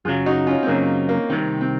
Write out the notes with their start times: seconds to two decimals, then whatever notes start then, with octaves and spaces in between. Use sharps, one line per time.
0.05 F#2 C#3 F#3 F4 G#4
0.26 D#4 F#4
0.47 C#4 F4
0.63 C4
0.67 F#2 C#3 F#3 A#3 C#4
1.09 A#3
1.30 C2 C3 D#3 C4
1.61 C4